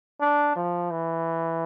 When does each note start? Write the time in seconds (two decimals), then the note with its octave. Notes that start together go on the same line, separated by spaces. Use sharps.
0.21 D4
0.56 F3
0.91 E3